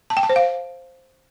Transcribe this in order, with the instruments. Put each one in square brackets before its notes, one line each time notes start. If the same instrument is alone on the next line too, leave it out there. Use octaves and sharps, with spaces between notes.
[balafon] A5
G5
A5
C5
F5